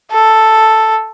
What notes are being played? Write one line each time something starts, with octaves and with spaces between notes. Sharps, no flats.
A4